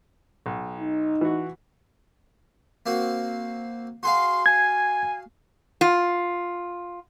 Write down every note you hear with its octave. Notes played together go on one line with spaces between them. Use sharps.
B1
D#4
E3 F#4
A#3 C4 F#4
F#4 G#4 F5 C6
G#5 G#6
F4